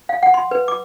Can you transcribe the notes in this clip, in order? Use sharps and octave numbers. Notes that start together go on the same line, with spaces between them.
F5
F#5
C6
B4
D6